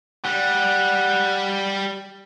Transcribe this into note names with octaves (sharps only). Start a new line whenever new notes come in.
G3 F#5